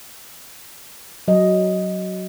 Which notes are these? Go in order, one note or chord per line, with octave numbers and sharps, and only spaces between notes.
F#3 D#5